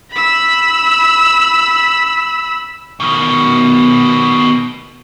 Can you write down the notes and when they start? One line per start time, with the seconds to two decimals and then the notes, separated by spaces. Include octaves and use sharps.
0.12 B5 E6
3.00 B2 D#3